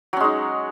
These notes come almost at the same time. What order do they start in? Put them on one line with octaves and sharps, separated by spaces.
F#3 C#4 G#3 D#4